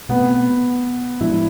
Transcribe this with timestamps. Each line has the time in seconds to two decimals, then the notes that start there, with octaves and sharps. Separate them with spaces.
0.09 B2 A3 B3 C4
1.20 A2 F3 G#3 D4 E4